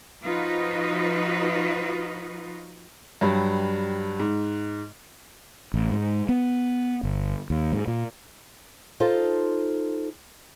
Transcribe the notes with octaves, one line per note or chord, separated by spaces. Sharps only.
F3 D#4 F4 F#4 B4 D#5
G2 F#3 G3
G#2
A1
G#2
B3
G1
D#2
G#2
A#2
D#4 F4 A4 C5